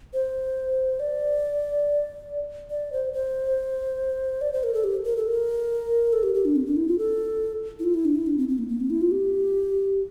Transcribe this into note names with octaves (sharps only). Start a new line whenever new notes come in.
C5
D5
D5
C5
C5
D5
C5
A#4
A4
G4
A#4
A4
A#4
A4
G4
G4
D4
C4
D4
E4
F4
A4
E4
F4
E4
D4
E4
D4
C4
C4
A#3
A#3
C4
E4
F4
G4